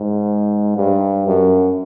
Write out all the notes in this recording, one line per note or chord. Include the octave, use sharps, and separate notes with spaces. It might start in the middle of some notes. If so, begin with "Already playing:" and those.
Already playing: G#2
G2
F#2